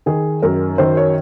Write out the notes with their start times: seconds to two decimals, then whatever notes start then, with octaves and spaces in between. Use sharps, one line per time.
0.06 D#3 G#4
0.42 F#2 A#4
0.78 D#3 C5
0.97 C#5